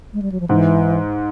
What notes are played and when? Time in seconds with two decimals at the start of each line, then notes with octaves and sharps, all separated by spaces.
0.13 G#3
0.22 G3
0.32 F#3
0.40 F3
0.49 G#2 E3